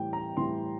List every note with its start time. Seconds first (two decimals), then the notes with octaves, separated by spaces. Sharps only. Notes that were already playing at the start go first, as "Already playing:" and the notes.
Already playing: A2 E3 G3 G5
0.13 A#5
0.37 A2 E3 G3 C6